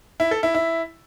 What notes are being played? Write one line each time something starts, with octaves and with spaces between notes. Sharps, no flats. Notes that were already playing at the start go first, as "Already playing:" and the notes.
E4
A4
E4
E4